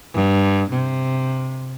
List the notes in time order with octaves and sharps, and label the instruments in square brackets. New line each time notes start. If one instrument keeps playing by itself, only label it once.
[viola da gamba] G2
C3